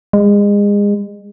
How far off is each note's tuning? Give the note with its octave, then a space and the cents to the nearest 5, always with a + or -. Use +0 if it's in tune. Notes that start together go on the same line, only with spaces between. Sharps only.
G#3 -30